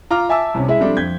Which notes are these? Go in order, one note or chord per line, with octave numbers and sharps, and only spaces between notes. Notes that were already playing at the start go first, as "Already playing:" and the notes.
F4 A#5 D6 F6
E5 G#5 A5 D6 E6
C2 C3 C#4
G#3 E4 E5
F3 G3 C4 D4 E4 A4
F2 G6 G#6 B6